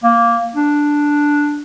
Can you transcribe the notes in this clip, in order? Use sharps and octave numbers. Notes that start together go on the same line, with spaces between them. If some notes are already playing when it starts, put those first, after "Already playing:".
A#3
D4